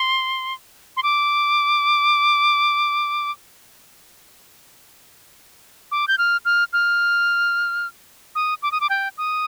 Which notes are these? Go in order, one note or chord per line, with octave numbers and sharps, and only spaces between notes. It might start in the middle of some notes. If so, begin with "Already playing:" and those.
Already playing: C6
C6
D6
D6
G6
F6
F6
F6
D#6
D6
D#6
D6
G5
D#6